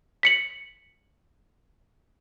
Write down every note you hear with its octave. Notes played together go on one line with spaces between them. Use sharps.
B6 C#7 F#7